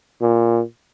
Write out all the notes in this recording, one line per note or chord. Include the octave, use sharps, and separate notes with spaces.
A#2